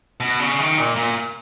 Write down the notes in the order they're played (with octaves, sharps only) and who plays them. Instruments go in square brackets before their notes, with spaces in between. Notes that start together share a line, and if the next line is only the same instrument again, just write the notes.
[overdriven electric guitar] B2
C#3
D#3
A#2
A#2